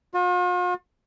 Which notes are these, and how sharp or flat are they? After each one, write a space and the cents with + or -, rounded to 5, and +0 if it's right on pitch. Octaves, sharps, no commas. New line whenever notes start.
F4 +45